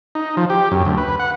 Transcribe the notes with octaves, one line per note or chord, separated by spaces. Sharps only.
D#4
F3
G4
F#2
D2
B4
F#5